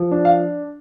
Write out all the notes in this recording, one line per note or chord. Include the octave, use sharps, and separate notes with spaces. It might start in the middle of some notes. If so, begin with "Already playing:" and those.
Already playing: F3
D4
F5